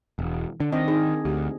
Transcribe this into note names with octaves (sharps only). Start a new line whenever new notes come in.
E1
D3 D4
D#3 C4 D#5
D#4 G#4
D2 G4